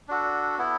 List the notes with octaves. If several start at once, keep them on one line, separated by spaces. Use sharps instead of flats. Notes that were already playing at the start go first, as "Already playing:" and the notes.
D4 F#4 A4
B3 E4 A4